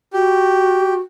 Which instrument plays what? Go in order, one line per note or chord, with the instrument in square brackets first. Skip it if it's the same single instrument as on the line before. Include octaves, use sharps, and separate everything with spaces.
[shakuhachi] F#4 [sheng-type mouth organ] G4